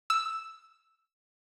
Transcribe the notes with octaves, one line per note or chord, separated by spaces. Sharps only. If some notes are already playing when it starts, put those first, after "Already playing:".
E6